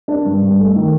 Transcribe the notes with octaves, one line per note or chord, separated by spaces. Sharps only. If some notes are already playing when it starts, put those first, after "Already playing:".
D4
G2
G2
A3
D#3